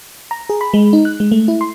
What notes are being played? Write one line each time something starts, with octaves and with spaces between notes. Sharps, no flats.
A#5
G#4
B5
G#3
D#4
F#6
G#3
A3
E4
C6